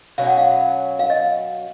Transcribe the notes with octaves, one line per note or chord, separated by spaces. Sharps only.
B2 F#3 C#4 F5
F#5
F5
F5
D#5